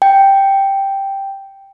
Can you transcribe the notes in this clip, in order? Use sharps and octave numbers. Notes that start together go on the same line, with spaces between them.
G5